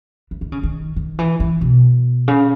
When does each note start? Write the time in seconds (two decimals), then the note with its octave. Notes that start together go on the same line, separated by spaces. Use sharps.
0.31 E3
0.41 D#3
0.52 C#3
0.63 D#3
0.96 D#3
1.19 E3
1.40 E3
1.61 B2
2.28 C#3